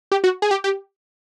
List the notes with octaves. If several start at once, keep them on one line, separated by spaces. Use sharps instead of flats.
G4
F#4
G#4
G4
G4